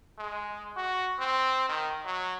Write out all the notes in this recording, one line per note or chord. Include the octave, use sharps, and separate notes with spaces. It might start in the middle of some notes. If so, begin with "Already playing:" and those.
G#3
F#4
C4
D#3
F#3